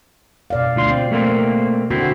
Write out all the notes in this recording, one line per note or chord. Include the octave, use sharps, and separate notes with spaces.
B2 D5 F5
D2 F4 C6
C4
A3 A#3 C4
D3 C4 E4 F#4